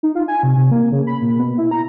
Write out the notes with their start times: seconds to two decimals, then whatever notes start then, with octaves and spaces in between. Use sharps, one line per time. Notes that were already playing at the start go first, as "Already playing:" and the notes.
0.03 D#4
0.15 F4
0.28 G#5
0.43 C3
0.56 C3
0.71 A#3
0.92 C#3
1.07 B5
1.21 A#2
1.39 B2
1.58 E4
1.71 A#5